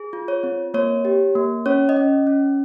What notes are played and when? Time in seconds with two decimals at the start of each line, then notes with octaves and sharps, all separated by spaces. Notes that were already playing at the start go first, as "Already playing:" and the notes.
Already playing: G#4
0.13 F4
0.28 C#5
0.43 C4
0.74 A#3 C#5
1.05 G4
1.35 A#3
1.66 C#4 C#5
1.89 D#5
1.96 C#4
2.27 C#4